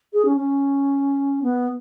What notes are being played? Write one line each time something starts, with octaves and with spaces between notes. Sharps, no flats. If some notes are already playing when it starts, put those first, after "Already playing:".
G#4
C#4
C#4
B3